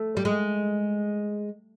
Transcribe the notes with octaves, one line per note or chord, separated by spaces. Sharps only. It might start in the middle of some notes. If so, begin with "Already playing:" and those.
Already playing: A3
G3
G#3